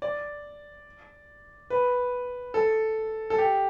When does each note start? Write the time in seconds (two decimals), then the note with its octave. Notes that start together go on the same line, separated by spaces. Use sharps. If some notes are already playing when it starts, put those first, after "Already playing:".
0.02 D5
1.70 B4
2.54 A4
3.30 A4
3.38 G4